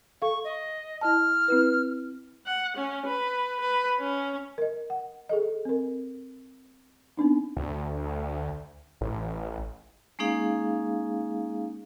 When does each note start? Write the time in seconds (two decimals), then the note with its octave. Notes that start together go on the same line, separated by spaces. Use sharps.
0.22 A4 F5 C#6
0.44 D#5
1.01 E4 D#5 A5 F6
1.48 C4 E4 B4
2.46 F#5
2.77 C#4
3.06 B4
3.61 B4
3.99 C#4
4.58 A#4 D#5
4.90 F#5
5.29 G#4 A4 D#5
5.65 C4 A#4
7.17 B3 C4 D4 D#4
7.57 D2
9.01 A1
10.19 G#3 A#3 C#4 D#4 G#4 F5